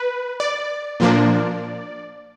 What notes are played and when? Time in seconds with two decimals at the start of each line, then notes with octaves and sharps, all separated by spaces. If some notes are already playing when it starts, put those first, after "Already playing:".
Already playing: B4
0.40 D5
1.00 A#2 F3 A#3 D4